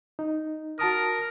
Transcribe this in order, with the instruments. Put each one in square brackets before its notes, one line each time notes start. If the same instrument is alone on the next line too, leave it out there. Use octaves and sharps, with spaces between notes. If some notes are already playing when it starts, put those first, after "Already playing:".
[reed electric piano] D#4
[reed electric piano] F#4 A5 D#6 [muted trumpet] A#4